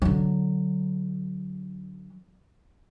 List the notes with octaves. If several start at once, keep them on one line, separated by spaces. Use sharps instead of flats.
D3 F#3